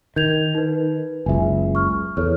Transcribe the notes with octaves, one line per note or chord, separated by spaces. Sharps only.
D#3 G6 G#6 F7
D#4 B4
F#1 C#2 E5 G#5
C#6 F6
E2 A4 C#5 F6